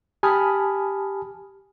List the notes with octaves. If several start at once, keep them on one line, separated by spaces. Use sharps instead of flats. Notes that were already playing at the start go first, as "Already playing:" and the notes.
G4 G#5 A5 B5 D#6 F6